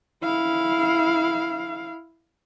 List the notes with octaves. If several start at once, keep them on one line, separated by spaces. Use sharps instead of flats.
E4 F5